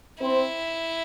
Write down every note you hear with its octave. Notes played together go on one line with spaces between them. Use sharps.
C4 E4